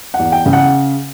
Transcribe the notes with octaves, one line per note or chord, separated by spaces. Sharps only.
F#5
E2
G5
C#3
F#5